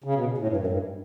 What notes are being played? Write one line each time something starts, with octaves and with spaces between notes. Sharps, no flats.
C#3
B2
A2
G2
F#2
G2